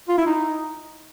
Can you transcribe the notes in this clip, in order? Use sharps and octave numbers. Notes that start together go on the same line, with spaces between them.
F4
E4
D#4